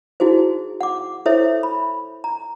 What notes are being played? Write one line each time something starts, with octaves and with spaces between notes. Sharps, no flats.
D#4 E4 F#4 G#4 C5
F#5 D6
E4 A4 C5 C#5 E5
B5
A#5